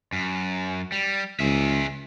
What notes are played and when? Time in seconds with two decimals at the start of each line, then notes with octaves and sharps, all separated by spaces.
0.13 F#2
0.92 G3
1.40 C#2 G#4 E5